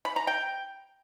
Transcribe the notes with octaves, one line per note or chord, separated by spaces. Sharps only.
B5
A#5
G5